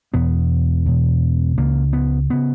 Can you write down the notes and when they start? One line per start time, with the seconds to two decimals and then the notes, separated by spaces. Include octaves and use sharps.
0.13 E2 B2 B3
0.86 E2 B2
1.57 C#2 C#3 A#3
1.93 B3
2.30 C#3 B3